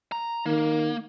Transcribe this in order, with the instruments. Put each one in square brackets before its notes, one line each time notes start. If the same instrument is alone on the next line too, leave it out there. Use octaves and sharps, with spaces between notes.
[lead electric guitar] A#5
[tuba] D#3 [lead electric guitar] A#3